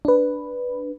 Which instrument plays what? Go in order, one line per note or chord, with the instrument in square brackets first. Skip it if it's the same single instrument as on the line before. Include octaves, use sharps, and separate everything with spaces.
[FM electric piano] D4 B4